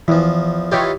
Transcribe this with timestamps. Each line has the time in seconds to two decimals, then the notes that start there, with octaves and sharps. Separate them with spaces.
0.08 E2 E3 F3
0.72 E3 D#4 F4 G4 C#5